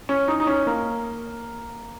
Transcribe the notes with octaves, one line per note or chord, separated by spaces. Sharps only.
C#4
D#4
D#4
C#4
A#3